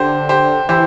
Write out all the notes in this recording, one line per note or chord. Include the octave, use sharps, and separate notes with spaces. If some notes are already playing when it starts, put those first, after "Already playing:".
Already playing: D3 G4 C5
G4 C5
E3 G4 C5